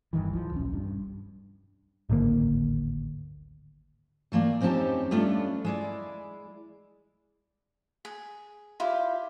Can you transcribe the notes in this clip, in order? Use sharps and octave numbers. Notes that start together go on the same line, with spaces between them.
F#1 G2 D#3 E3
C#2 F3
D#1 B1 C#4
G2
D1 G#1 D2 A#3
E3 A3 A#3 D5
F2 C4 C#4 D#4 G4 A5
G3 A3 C#4 D4 F4 A4
G#3 E4 D5
G#4
E4 F4 G4